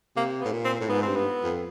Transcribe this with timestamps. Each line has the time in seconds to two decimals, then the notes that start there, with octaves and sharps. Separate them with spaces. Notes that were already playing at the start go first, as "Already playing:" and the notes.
0.16 C3 A#3
0.41 B3
0.45 A2
0.52 A#2
0.65 C4
0.81 A2
0.89 G#2 B3
1.03 G2 C4
1.16 B3
1.44 F2